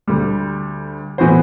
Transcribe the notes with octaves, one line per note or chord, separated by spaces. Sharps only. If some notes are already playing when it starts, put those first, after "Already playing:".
D2 D3 G3
A2 E3 B3 F#4 C5